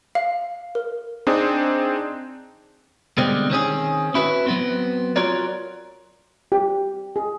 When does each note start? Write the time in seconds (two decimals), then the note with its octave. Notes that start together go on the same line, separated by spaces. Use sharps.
0.15 F5
0.75 A#4
1.27 C4 D4 D#4 G#4
3.18 B2 D3 G3 G#3 C4
3.50 D#3 C4 C#4 G#4
4.14 C#4 E4 F#4 G4 B4
4.46 F#3 B3 C4
5.16 F4 F#4 A#4 C#5 D5
6.52 G4
7.16 G#4